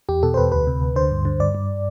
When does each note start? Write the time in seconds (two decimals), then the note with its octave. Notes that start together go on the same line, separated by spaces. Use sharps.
0.09 E2 G4
0.23 B2 A4
0.34 C5
0.37 E2 B4
0.52 D2 B4
0.67 C3
0.81 D2
0.96 D3 C5
1.11 G2
1.25 D3
1.40 G2 D5
1.55 G2